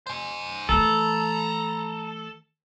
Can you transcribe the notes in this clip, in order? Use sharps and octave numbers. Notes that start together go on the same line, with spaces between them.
C5 G#5
E3 A3 A4 A5 A#5